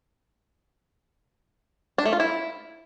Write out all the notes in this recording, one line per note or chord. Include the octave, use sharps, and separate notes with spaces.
D4
A3
F4
E4